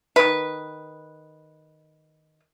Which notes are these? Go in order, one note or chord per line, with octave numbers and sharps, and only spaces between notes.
D#3 B4